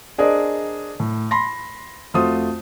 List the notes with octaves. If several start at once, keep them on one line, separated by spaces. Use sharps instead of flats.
D4 G#4 A#4 C5 D5 D#5
A2
B5 C6 A#6
F2 A3 F4 F#4 C5 D#6